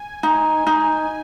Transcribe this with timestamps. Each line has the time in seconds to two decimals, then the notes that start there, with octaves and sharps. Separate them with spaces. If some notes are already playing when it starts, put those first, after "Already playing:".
Already playing: G#5
0.23 D#4
0.67 D#4